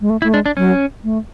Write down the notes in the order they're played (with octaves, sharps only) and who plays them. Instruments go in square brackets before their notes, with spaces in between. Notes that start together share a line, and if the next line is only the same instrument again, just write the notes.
[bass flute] G#3
A3
[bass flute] A3 [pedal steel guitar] E4
[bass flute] G#3 [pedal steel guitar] D4
[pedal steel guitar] D4
[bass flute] F#3 [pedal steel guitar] C#4
[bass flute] A3